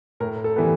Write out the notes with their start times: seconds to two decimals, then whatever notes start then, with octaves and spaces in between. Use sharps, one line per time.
0.20 A2 A#4
0.44 A4
0.56 E3 G3 B3